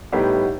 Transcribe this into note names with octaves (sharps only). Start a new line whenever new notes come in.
A2 G3 B3 D#4 G4